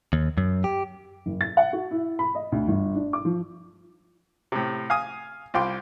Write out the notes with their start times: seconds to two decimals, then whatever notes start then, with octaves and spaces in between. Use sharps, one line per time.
0.13 D#2
0.38 F#2
0.64 G4
1.26 F#1
1.41 A6
1.57 F#5
1.73 F#4
1.91 E4
2.19 B5
2.35 D#5
2.52 D2
2.68 G1
2.95 D4
3.13 D6
3.25 F3
4.52 A2 C3
4.90 F5 G#5 D#6
5.54 C2 F4 G5 C6 D6